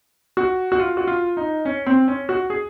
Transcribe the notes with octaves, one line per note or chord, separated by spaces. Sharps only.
F#4
F#4
F4
F#4
F4
D#4
C#4
C4
C#4
F#4
G#4